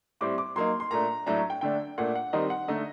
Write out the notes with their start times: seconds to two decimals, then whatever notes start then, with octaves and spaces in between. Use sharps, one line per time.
0.21 A2 G3 C4 D6
0.38 D6
0.56 F#3 A#3 D#4 C6
0.80 C6
0.91 A#2 A3 D4 A#5
1.26 A2 F#3 A3 D4 A#5
1.50 G5
1.61 D3 A3 D4 G5
1.98 A#2 A3 D4 F#5
2.15 F#5
2.33 D#3 G3 C4 D#4 D#5
2.50 F#5
2.68 D3 A3 D#4 D#5